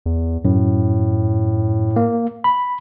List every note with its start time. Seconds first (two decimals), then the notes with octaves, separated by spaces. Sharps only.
0.06 E2
0.45 F#2 A2
1.96 A#3
2.44 B5